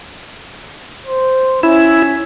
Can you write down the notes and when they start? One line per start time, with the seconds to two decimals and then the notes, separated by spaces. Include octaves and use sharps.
1.06 C5
1.63 C#4 E4